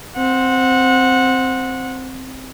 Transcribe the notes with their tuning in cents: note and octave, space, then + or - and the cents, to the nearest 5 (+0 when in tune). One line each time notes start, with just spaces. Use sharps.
C4 +0 F#5 -20